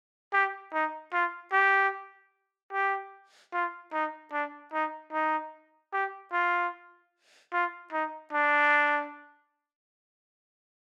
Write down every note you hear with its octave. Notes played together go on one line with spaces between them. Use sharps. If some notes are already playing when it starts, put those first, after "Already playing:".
G4
D#4
F4
G4
G4
F4
D#4
D4
D#4
D#4
G4
F4
F4
D#4
D4